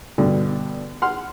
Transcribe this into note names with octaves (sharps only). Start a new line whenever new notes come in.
G2 B2 D3
F#5 C6 F6